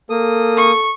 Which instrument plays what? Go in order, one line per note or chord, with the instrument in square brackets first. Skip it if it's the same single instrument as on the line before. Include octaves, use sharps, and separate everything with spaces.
[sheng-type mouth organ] A#3 D#6 [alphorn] A4
[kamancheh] C#6